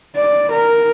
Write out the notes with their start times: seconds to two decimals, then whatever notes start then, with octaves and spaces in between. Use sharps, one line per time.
0.16 D5
0.51 A#4